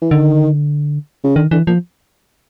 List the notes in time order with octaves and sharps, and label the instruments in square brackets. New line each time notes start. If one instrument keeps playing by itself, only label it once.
[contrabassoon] E3
[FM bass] D3 [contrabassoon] D#3
[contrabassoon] C#3
[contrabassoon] D3 [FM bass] D#3
[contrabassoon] D3 [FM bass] E3
[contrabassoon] A#2 [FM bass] F3